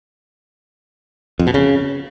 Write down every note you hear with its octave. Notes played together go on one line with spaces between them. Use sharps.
F2
B2
C#3